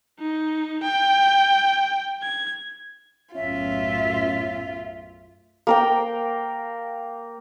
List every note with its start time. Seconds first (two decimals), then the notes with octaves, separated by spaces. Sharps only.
0.20 D#4
0.83 G5
2.22 G#6
3.35 B1 F#2 A2 C#4 F4 E5
5.67 A#3 A#4 G5